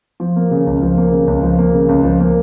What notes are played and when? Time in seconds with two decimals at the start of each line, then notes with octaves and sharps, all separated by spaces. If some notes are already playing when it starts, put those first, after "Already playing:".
0.20 F3
0.36 A#3
0.51 C#3
0.67 C#2
0.82 F3
0.97 A#3
1.12 C#3
1.27 C#2
1.43 F3
1.59 A#3
1.73 C#3
1.89 C#2
2.04 F3
2.20 A#3